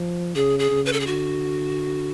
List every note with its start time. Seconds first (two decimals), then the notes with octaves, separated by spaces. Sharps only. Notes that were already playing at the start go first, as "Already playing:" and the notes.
Already playing: F3
0.35 C#3 G#4
0.59 G#4
0.71 C#3
0.86 B4
0.93 A4
1.00 G#4
1.07 D3 F#4